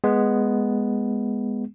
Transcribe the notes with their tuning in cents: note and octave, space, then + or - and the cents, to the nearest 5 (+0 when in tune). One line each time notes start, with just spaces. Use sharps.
G#3 +0 B3 +0